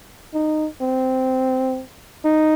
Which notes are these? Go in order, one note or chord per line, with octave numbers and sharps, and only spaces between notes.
D#4
C4
D#4